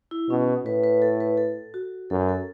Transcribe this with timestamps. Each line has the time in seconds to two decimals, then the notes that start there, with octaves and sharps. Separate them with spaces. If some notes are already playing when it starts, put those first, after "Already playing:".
0.11 E4
0.30 B2 C#4
0.65 A2 B4
0.84 B4
1.02 A4
1.20 B4
1.38 A4
1.74 F#4
2.10 F#2 A4
2.29 A4